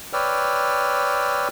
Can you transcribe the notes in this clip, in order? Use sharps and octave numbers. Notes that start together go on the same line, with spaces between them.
B4 C#5 D5 G5 E6 F6